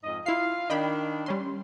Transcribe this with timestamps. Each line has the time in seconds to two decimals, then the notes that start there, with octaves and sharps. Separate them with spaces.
0.04 F2 G#2 D#5
0.26 E4 F4 F5 C7
0.70 D#3 D4 D#5 G5 B5
1.26 G3 C#4 C6